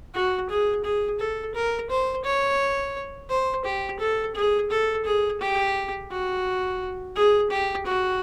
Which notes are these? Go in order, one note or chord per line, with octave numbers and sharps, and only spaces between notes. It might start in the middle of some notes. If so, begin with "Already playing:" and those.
F#4
G#4
G#4
A4
A#4
C5
C#5
C5
G4
A4
G#4
A4
G#4
G4
F#4
G#4
G4
F#4